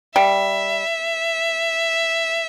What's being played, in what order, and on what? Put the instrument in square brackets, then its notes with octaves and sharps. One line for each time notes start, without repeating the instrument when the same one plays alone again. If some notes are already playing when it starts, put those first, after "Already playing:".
[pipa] G3 [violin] E5